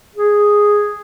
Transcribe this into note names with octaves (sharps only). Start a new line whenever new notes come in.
G#4